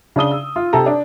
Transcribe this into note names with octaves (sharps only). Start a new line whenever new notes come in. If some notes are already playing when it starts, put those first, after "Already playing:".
C#3 D4 D#6 G7
E6
F4
C3 A4 A#5
D4